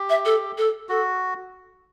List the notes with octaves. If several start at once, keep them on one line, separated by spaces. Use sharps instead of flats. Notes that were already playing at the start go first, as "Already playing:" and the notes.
Already playing: G4
E5
A4
A4
F#4 A4